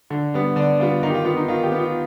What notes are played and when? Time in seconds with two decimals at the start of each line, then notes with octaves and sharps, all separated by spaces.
0.10 D3
0.34 G3 B3
0.56 D3 D5
0.79 G3 B3 F4
1.03 D#3 D#4
1.10 G4
1.14 F4
1.25 B3 F4
1.37 D#4
1.48 D#3 F4
1.63 G4
1.72 B3
1.79 F4